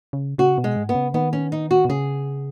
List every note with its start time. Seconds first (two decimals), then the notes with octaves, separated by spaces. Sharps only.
0.13 C#3
0.38 C#3 F#4
0.58 B2
0.64 G#3
0.76 G#2
0.89 B3
0.95 C#3
1.14 D#3 B3
1.33 C#4
1.52 D#4
1.71 F#4
1.85 B2
1.89 C#3 G#4